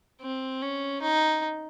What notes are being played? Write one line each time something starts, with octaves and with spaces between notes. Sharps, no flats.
C4
C#4
D#4